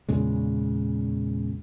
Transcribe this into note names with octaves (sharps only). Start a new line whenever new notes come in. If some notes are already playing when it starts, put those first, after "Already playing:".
E2 A#2 C#3 G#3